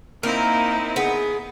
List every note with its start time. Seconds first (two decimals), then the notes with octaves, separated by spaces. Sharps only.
0.23 A#3 C4 D#4 E4 A#4
0.96 B3 G#4